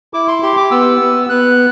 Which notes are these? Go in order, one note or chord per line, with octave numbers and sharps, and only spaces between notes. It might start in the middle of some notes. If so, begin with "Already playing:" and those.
E4 D6
C6
G4 C6
D6
B3 E6
B3
B3 F#6